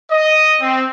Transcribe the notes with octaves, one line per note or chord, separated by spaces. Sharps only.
D#5
C4